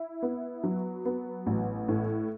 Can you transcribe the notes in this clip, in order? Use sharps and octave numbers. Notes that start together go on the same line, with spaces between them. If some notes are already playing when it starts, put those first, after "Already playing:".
Already playing: E4
B3
F#3
B3
A1
A2